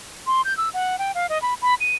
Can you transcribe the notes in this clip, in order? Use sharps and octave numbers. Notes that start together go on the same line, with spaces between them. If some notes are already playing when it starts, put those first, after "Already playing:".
C6
G6
E6
F#5
G5
F5
D#5
B5
B5
D#7